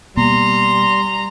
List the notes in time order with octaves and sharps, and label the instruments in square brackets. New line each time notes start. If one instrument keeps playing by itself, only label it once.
[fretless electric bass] B2 A#3 B3 [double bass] G3 [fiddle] A#5 [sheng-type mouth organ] C6